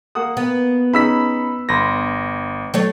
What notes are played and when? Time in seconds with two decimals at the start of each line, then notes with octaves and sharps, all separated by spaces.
0.15 A#3 F#5 D#6
0.37 B3
0.94 C#4 D#4 G#4 B5 E6 B6
1.69 G1 B5 C6 A#6
2.74 F#3 A3 C#5